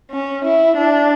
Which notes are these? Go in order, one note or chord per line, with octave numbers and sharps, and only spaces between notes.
C#4
E4
D4